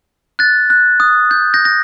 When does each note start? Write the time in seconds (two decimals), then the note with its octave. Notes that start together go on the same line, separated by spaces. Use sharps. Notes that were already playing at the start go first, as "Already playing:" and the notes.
0.39 F#6 A6
0.70 F#6
1.00 D#6
1.31 G6
1.54 G6 A#6
1.65 A#6